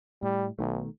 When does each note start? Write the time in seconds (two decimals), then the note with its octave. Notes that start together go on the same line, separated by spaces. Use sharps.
0.23 A2 G3
0.59 B1 B2 D#3 A3